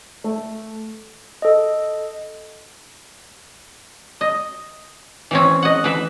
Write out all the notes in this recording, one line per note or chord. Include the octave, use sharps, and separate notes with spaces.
A3
A4 D#5
D#5
E3 C4 C#4
D#5 F#5
E3 B4 E5